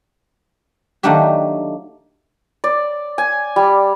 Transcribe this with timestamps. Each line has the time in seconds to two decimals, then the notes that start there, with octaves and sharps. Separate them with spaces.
1.03 D#3 F#3 A3 A#3 D4 G4
2.64 D5
3.18 G#5
3.56 G3